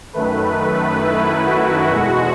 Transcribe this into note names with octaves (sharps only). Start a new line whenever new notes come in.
F#2 D#3 A3 B4
E4
F#4
E2 B2 G#3